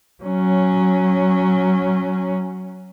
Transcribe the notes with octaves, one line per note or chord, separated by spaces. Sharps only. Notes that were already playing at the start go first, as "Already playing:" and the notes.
F#3 C#4